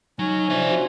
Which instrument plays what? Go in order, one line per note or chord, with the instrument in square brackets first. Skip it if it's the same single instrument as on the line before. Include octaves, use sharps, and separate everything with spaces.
[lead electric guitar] F#3 [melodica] C#4 C#5 G#5 [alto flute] D#4
[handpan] C3 D4 F4 [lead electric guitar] F3 E5 [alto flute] C5
[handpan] D4 D#4 F#4